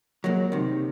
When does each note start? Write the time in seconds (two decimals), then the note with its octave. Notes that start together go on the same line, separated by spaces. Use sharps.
0.24 F#3 G#3 A#3
0.52 C3 D#3